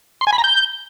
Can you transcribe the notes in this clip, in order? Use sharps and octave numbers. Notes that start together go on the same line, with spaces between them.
C6
G#5
B5
A#5
G6